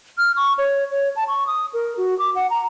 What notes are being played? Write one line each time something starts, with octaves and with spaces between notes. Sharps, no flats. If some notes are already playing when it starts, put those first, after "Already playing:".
F6
C#6
C#5
C#5
A5
C#6
D#6
A#4
F#4
D6
F#5
A#5